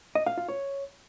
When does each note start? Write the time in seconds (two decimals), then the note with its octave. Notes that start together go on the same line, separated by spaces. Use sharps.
0.15 D#5
0.26 F5
0.37 F4
0.49 C#5